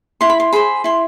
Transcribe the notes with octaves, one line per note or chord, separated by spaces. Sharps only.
E4 C6
B5
C6
G#4 C5 B5
E4 C6